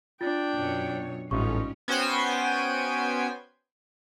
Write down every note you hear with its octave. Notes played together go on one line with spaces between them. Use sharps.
D4 F4 G5 A6
F#2 B2 C#5
A1 G#2 G3 C#4 D#4 F4 C#6
B3 C#4 F#4 C5 G5 G#5